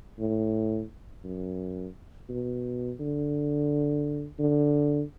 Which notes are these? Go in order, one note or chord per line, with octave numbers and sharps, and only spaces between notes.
A2
F#2
B2
D3
D3